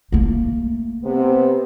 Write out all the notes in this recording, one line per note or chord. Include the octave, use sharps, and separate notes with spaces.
A3 A#3
C3 B3